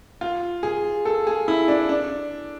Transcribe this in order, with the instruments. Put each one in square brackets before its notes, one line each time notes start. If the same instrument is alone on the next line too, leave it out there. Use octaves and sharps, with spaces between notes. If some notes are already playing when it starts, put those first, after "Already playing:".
[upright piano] F4
G#4
A4
G#4
E4
D4
D4